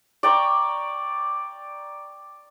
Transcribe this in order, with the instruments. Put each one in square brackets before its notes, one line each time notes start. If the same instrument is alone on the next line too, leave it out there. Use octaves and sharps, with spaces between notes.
[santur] D5 G5 A#5 C#6